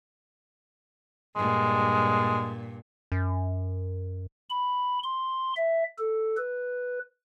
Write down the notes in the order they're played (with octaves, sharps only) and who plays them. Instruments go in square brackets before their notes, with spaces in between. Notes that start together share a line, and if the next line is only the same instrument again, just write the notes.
[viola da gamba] G2 A#2 [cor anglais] G#3
[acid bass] F#2
[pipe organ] B5
C6
E5
A4
B4